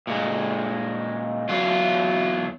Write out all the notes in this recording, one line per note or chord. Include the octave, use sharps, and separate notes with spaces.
A#2 G#3
E2 F#3 F4